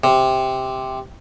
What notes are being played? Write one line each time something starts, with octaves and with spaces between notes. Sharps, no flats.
C3